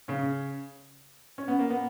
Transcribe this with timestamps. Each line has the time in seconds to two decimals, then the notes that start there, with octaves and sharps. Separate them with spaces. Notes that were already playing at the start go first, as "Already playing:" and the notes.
0.08 C#3 C#4
1.38 C#4
1.48 B3
1.59 A#3
1.70 B3